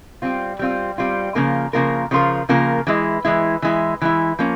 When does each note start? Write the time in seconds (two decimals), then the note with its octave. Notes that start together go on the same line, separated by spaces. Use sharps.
0.22 G3 C4 F4
0.59 G3 C4 F4
0.98 G3 C4 F4
1.35 C#3 F3 A#3 F4 A#4
1.73 C#3 F3 A#3 F4 A#4
2.11 C#3 F3 A#3 F4 A#4
2.49 C#3 F3 A#3 F4 A#4
2.87 E3 G#3 E4
3.25 E3 G#3 E4
3.62 E3 G#3 E4
4.02 E3 G#3 E4
4.39 F3 A#3 C#4